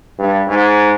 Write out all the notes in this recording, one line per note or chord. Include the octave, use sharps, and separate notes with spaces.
G2
G#2